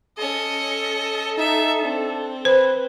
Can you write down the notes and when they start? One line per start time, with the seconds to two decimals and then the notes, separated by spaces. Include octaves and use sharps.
0.18 C#4 A4 D#5
1.38 D#4 E5
1.81 C4 D4
2.45 B4 C5